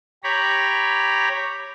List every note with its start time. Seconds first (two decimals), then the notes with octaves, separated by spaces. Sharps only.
0.24 G4 C#5 A#5 B5